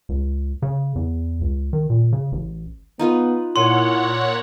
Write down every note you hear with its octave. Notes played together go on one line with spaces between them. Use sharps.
C#2
C#3
E2
C#2
D#3
A#2
C#3
A1
B3 D#4 F4 B4
A#2 E4 B4 C#5 F#5 C6